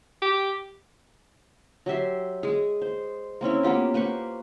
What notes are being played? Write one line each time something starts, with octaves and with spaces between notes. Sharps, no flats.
G4
F#3 G4 E5 C6
G#3 G#4
C5
A#3 C4 C#4 E4
A#3 B3 F4 G4
A#3 B4 C5 C#6